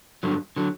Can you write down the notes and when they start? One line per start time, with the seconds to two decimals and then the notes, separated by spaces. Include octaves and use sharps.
0.23 G2 D3 F#3
0.56 D3 F#3